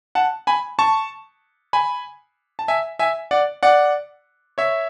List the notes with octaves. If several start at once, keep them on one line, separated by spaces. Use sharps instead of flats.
F#5 A5
G#5 B5
A5 C#6
G#5 B5
A5
E5 G#5
E5 G#5
D5 F#5
D5 F#5
C#5 E5